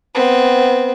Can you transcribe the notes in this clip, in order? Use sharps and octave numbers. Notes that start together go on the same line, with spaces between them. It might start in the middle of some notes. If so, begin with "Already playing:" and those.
B3 C4